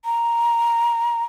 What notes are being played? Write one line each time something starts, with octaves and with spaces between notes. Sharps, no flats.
A#5